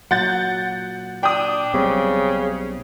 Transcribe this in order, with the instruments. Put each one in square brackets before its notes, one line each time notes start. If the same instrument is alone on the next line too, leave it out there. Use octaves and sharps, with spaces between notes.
[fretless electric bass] A#2 F#3 [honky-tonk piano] F#5 G6 A6
[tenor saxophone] D4 [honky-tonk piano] G5 D#6
[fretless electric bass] B1 G3 C4 [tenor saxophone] C#3